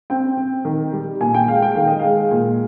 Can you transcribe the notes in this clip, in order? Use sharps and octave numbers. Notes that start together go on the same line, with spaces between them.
C4 G5
C4
D#3
G3
A#2 G#5
G5
G#3 F5
G5
D#3 F5
D#5
G#3 F5
A#2